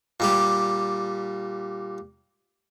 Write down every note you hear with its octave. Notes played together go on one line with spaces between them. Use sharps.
A#2 G3 G4